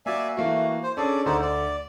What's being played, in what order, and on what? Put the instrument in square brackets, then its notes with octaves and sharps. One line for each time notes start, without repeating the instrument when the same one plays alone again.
[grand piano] A#3 F#4 [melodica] D5 E5 G#5
[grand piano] E3 A#3 F#4 [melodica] A3
[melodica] C5
[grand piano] C#4 D4 G#4 [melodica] A4 D5
[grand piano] D2 D3 [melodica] D#4 C5 D5
[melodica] D5